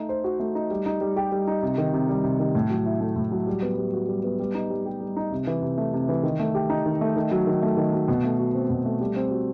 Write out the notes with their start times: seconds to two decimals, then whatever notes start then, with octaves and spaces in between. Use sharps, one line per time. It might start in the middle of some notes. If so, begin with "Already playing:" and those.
Already playing: A3 D#4
0.09 C5
0.24 F#4
0.39 A3
0.55 D#4
0.71 G3
0.86 D#4
1.01 G3
1.16 G4
1.32 G3
1.47 D#4
1.62 C3
1.78 D#3
1.93 C3
2.09 G3
2.24 C3
2.40 D#3
2.55 A2
2.70 F#3
2.86 E4
3.00 A3
3.16 A2
3.32 F#3
3.47 G3
3.62 B3
3.78 G3
3.93 F#4
4.08 G3
4.24 B3
4.39 G3
4.55 D#4
4.70 G3
4.86 G4
5.01 G3
5.17 D#4
5.31 C3
5.47 E3
5.62 C3
5.78 A3
5.93 C3
6.09 E3
6.23 D#3
6.40 A3
6.55 G4
6.70 D#4
6.86 D#3
7.01 A3
7.16 D#3
7.31 F#3
7.47 D#3
7.63 A3
7.77 D#3
7.93 F#3
8.08 B2
8.24 A3
8.39 F#4
8.54 C4
8.70 B2
8.85 A3
9.00 G3
9.16 C4
9.31 F#4